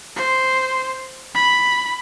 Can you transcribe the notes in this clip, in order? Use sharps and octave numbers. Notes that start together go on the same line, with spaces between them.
C5
B5